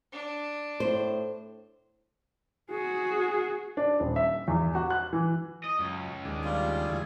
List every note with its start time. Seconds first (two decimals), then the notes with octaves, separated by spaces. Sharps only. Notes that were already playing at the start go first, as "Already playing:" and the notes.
0.12 D4
0.80 A2 C5
2.70 F#4 G#4
3.77 D4
4.00 D#1
4.16 E5
4.48 E2
4.75 F#4
4.90 F#6
5.13 E3
5.64 D#5
5.79 C#2 F#2
6.25 D#2 G#3 D4
6.44 G3 F4
6.89 E2 D3 G#4